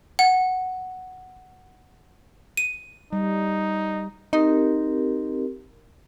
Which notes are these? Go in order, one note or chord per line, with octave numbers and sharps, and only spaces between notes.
F#5
D#7
G3 D#4
C4 D#4 G4 A#4